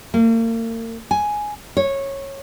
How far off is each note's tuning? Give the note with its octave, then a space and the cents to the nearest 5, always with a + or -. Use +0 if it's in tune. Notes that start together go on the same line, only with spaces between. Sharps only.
A#3 -40
G#5 +5
C#5 -15